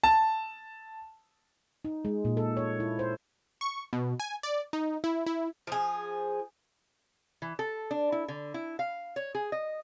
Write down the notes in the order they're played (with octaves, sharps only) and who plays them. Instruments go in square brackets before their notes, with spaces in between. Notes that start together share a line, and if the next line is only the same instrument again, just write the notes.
[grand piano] A5
[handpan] D#4
G#3
A#2
A4
C#5
E4
C5
[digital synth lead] C#6
B2
G#5
D5
D#4
E4
E4
[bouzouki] F3 G#4
[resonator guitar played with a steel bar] E3
A4
D4
E4
D3
E4
F5
C#5
G#4
D#5